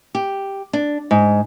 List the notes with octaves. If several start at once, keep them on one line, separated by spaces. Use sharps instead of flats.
G4
D4
G#2